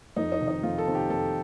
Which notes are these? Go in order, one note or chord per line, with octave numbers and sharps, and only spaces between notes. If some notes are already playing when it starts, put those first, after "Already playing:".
F2 D#4
D#4
C3 D#3
D#4
F2 F4
A4
C3 D#3
G4
F2 A4